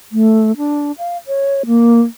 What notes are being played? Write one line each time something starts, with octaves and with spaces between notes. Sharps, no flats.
A3
D4
F5
C#5
A#3